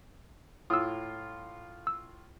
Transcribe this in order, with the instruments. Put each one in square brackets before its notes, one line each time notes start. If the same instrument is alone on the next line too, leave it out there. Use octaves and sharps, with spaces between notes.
[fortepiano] A2 F4 [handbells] D#6 E6
[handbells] E6